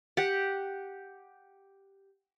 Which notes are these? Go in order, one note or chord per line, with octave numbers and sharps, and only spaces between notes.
G4 F#5